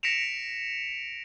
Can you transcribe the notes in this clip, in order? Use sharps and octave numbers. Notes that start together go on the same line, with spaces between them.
A#6 B6 C#7 D7 E7 F7